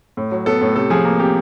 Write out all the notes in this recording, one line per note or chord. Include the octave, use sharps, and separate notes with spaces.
A2
F#3
B3 A4
A2
C3 A4
F3 G#4
A#3
C3 G4